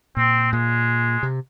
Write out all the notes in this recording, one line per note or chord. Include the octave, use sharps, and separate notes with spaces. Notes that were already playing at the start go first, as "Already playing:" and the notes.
A#2 C4
A#2 G#3
C3